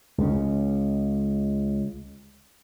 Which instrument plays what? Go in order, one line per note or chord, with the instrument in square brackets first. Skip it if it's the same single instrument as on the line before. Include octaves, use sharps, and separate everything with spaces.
[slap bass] C#2 C#3